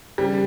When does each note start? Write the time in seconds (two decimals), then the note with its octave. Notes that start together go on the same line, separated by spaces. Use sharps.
0.18 C#3 G3
0.30 D#3